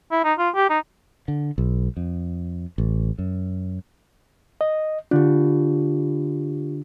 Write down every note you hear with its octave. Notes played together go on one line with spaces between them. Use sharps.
E4
D#4
F4
G4
D#4
D3
B1
F2
A1
F#2
D#5
D3 D4 F4 G4